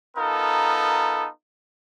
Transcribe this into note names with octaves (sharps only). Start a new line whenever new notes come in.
B3 D#4 F4 A4 A#4